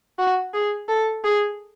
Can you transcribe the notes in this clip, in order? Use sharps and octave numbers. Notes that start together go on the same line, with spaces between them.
F#4
G#4
A4
G#4